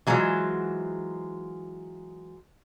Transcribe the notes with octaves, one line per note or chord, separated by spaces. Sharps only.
E3 F#3 G#3 F4 C5